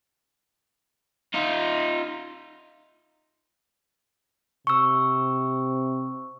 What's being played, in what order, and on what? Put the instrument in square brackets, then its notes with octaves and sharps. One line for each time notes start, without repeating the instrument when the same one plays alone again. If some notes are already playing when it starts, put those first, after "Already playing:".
[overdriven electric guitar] D#4 F4
[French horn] C3 [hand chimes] C#6 E6